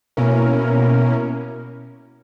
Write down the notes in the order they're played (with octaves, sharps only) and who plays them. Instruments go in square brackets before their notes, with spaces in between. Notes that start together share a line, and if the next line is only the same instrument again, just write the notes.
[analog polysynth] B2 A#3 C#4 E4 A#4